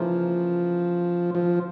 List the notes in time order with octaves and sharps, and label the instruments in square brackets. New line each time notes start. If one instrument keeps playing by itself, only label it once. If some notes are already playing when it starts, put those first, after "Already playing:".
Already playing: [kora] C#3 E3 A#3 [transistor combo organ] F3
[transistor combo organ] F3